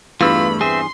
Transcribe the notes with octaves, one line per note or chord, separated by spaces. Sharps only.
E2 G2 A3 F4 B5 E6
C4 G#4 E5 C6